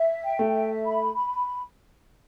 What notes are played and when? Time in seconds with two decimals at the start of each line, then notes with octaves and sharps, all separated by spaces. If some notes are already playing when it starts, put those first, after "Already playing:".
Already playing: E5
0.24 G5
0.39 A3
0.54 E5
0.85 B5
1.15 B5